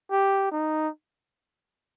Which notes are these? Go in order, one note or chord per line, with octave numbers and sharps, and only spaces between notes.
G4
D#4